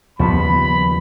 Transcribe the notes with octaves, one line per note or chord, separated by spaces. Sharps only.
D#2 C#3 F3 G3 B3 B5